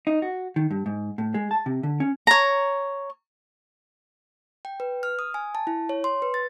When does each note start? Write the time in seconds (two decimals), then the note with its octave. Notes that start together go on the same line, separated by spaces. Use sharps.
0.07 D#4
0.22 F#4
0.56 D#3
0.71 G2
0.86 G#2
1.18 A2
1.34 G#3
1.51 A5
1.66 C3
1.83 D3
2.00 C#4
2.27 C#5 A#5
4.65 G5
4.80 B4
5.03 F6
5.19 D#6
5.34 G#5
5.55 A5
5.67 E4
5.89 C#5
6.04 C6
6.22 B4
6.34 A6